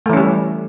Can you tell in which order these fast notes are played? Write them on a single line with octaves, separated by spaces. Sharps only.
A3 E3 C#4 G3